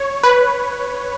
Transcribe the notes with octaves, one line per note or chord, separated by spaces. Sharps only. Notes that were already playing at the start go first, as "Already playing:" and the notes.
Already playing: C#5
B4